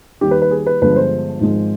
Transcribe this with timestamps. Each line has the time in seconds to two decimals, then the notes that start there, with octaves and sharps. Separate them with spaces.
0.21 D#2 D#3 G3 G4
0.31 B4
0.42 B4
0.51 G#4
0.67 B4
0.81 G1 G2 D3 F3 G#3 B4
0.96 C5
1.40 G#1 G#2 F3 G#3